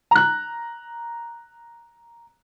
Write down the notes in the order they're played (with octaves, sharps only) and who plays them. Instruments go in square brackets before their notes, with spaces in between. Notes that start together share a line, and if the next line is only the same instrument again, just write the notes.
[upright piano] A#5 F#6